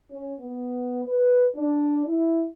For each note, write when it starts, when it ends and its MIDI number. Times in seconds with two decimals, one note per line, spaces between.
0.11 0.34 61
0.40 1.05 59
1.05 1.45 71
1.56 2.06 62
2.07 2.45 64